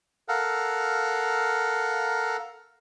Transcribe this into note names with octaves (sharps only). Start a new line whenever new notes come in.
A4 A#4 F5 F#5